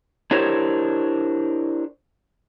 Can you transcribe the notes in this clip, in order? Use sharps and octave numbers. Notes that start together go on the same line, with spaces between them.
D4 E4 G4 A#4 C5 C#5